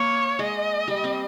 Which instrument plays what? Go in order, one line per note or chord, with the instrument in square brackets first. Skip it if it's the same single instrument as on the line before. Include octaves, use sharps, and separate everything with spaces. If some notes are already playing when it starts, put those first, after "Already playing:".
Already playing: [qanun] A#3 [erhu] C#5
[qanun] G#3 [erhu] D#5
[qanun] G3
C4